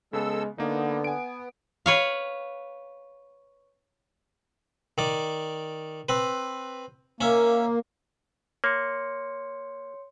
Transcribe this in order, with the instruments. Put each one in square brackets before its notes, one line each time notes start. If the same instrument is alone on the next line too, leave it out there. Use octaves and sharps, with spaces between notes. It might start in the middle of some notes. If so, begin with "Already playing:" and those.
[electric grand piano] C#3 B3 [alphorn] G#3 [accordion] A4 E6
[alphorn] D3 [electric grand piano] A#3 D#4 [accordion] B3
[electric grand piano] G#5 D7
[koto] B4 C#5 F5
[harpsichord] D#3 D5
C4 B4
[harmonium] A#3 [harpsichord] C#4 E5
[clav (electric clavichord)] A#3 [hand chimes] C#5 C6 C#7